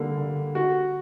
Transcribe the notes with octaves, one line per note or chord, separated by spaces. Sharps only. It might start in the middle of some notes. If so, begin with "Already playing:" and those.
Already playing: D3 G3 A#3
D3
F#4